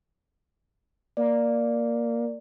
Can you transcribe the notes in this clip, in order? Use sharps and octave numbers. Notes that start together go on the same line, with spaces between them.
A#3 D5